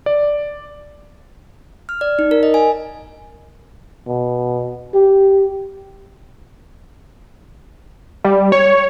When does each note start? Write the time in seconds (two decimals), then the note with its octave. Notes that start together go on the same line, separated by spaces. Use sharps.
0.06 D5
1.89 F6
2.01 D5
2.19 D#4
2.31 A#4
2.43 D#5
2.54 G#5
4.08 B2
4.94 G4
8.25 G3
8.52 C#5